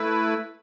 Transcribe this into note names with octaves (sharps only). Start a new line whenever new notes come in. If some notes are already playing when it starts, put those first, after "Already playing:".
Already playing: A3 E4 B4